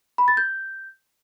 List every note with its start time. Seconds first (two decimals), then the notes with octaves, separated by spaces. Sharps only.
0.18 B5
0.28 A6
0.37 G6